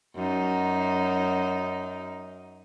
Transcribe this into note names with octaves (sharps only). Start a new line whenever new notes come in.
F#2 D#4